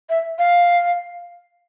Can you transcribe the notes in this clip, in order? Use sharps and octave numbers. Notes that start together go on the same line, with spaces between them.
E5
F5